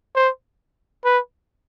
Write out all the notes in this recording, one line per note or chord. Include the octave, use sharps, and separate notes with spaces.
C5
B4